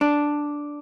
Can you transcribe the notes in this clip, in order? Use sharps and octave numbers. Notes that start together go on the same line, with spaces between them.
D4